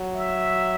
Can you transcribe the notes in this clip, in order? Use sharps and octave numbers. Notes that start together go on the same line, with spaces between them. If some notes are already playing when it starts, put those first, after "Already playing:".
Already playing: F#3
E5